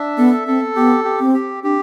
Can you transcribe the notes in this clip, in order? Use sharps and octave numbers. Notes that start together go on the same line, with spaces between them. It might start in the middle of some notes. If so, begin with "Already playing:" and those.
Already playing: D4 E5
B3 A4
C4 A4
B3 G4
G4
C4
G4
D4 G4